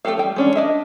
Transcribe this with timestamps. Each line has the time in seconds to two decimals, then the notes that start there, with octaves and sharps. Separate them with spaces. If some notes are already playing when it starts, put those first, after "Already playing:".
0.05 A3 D4 G4 A4 F5
0.18 G3 G5
0.36 G#3 C#4 D4
0.56 D4 D#5 E5